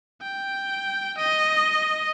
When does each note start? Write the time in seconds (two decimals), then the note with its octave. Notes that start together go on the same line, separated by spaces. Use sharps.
0.22 G5
1.18 D#5